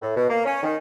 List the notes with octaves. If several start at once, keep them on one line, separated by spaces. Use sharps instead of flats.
A2
B2
A#3
C#4
D#3